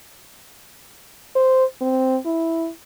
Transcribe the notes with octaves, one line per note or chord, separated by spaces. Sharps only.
C5
C4
E4